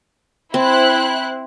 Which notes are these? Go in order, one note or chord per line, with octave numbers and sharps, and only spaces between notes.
C4 E4 C5 F#6